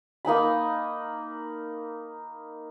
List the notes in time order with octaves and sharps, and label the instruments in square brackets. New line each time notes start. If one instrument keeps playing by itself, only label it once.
[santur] A#3 D#4 G#5 B5